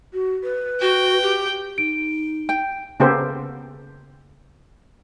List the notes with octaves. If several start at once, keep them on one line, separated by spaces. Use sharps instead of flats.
F#4
B4
F#4 G5
G4
D#4 D7
G5
C#3 A#3 B3 G4 A4 C5